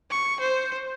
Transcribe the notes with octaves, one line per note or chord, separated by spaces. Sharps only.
C#6
C5